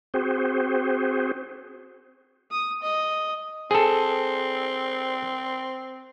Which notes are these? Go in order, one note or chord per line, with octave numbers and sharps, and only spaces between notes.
C4 F#4 G#4 C5
D#6
D#5
C4 G#4 A4